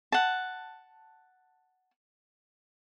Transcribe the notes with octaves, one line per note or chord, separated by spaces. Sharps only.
F#5 A5